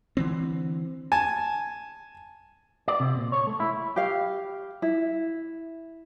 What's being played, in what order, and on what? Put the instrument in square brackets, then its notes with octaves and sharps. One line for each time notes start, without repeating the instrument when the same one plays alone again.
[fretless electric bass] D3 E3 C4
[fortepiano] G#5 A5
[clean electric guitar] D5
C3
A#2
C#5
A3
E4
[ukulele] G4 F5
E4